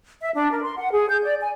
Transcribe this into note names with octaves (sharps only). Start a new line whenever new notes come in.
E5
D4
A#4
C6
F#5
G#4
G6
D5
G#5